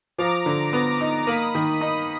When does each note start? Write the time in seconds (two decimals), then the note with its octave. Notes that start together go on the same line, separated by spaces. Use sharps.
0.18 F3 A#5 D6
0.46 D3
0.73 B3 A#5 D6
1.01 D#4
1.27 A#3 B5 D#6
1.55 D#3
1.81 D#4 B5 D#6